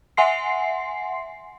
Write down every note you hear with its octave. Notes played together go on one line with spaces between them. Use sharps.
E5 F#5 G#5 C6 C7